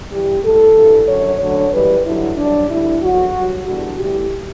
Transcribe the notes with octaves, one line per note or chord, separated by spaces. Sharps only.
G2 E3 G3 G4
A2 G3 A4
G2 E3 G3
F#2 D3 F#3 C#5
D2 D3 F#3 C#5
F#2 E3 G3 B4
G2 D3 F#3 E4
G2 F#3 D4
D2 D3 G3 E4
E2 D3 F#3 F#4
G2 F#3
E2 D3 G3 F#4
A2 E3 G3 G4